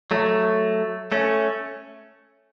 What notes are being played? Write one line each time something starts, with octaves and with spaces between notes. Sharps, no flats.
F#3 A3
A3 C#4